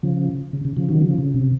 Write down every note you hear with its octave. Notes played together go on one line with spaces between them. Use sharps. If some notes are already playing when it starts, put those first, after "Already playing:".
C#3 F3
C#3
C#3
C#3 F3
D#3 F#3
C#3 F3
C#3
C3